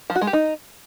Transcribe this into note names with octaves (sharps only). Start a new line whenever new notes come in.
F3
F#4
G#3
G4
D#4